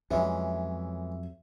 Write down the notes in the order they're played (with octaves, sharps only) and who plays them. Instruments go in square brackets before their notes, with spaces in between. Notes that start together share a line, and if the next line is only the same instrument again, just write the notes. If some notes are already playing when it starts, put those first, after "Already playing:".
[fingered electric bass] F2 F#3 [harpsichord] E3 G#3 C#4 [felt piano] E5